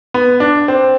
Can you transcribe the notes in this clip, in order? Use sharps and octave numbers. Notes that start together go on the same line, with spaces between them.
B3
D4
C4